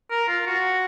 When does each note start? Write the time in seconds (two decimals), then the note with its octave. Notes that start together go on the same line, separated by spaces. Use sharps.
0.11 A#4
0.29 F4
0.47 F#4